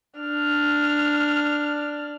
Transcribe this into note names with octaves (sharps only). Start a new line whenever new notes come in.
D4 F6